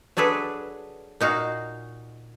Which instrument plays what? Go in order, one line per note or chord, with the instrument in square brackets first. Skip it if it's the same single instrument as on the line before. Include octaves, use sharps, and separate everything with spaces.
[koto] F#3 D4 G#4 A4 B4
A#2 D#4 F#4 F5